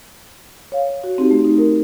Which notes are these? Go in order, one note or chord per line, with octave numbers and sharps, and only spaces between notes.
C#5 F5
F#4
C4 D#4 G4
A3
D#4
A#4